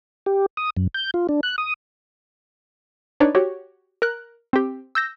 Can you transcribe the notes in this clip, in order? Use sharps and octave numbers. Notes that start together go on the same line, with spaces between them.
G4
D#6
F#2
G6
F4
D4
F#6
D#6
D4 D#4 B4 C#5 D5
F#4 G4 C#5
A#4 F#6
C4 G4
E6 G6 A#6